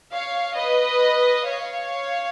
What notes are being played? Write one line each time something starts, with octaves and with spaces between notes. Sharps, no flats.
C#5 F5
B4 D#5
C#5 F5